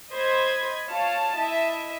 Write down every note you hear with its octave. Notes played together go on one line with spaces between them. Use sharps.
C5 D#5 B5 G#6
F4 C#5 F5 A5
E4 D#5 E5